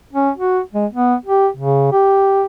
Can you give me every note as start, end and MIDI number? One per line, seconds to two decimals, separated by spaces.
0.13 0.30 61
0.37 0.60 66
0.74 0.86 56
0.93 1.15 59
1.26 1.48 67
1.57 1.91 49
1.92 2.45 67